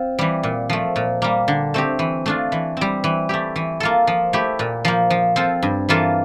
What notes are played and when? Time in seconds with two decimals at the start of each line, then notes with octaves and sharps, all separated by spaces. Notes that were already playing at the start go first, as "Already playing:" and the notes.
Already playing: C4 F4
0.19 E3 G3
0.43 A#2
0.70 F3 A3
0.96 A#2
1.22 G3 A#3
1.48 D3
1.74 A3 C4 G4
1.99 E3
2.26 A3 D4 F4
2.52 E3
2.77 G3 C4
3.04 E3
3.29 A3 E4 G4
3.56 E3
3.80 A#3 F4 A4
4.07 F3
4.33 A3 E4 G4
4.59 A#2
4.85 F3 A#3
5.10 F3
5.36 C4 F4 A4
5.63 G2
5.89 E3 A#3 F4 A4